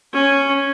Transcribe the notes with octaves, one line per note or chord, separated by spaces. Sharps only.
C#4